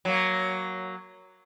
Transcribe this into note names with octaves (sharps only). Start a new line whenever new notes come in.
F#3 A#3